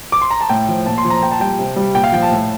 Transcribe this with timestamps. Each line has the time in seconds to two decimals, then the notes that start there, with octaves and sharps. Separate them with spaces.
0.12 D6
0.22 C6
0.31 A#5
0.41 A5
0.50 A2 G5
0.69 F3
0.86 A#2 A5
0.98 C6
1.05 F3
1.10 A#5
1.23 A#2 G5
1.32 A5
1.40 G3 G5
1.59 C3
1.76 G3
1.95 A#2 G5
2.04 F5
2.13 F3 G5
2.23 A5
2.32 A2